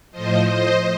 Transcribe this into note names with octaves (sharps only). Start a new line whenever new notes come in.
A2 F3 C5 D#5
C5 D#5